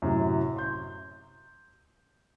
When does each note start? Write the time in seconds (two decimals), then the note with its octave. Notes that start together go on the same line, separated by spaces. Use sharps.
0.02 F#2 A2 C3 F#3
0.56 C6 G6